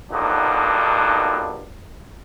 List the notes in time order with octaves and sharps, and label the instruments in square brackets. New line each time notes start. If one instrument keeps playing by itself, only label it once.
[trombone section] B1 G2 A#2 F#3 D4 D#4